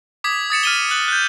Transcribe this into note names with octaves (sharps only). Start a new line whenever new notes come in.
D6 D#6 G#6 B6
D#6 A6 C#7 E7
F6 D#7 G7
F#6 F#7
F#6 G6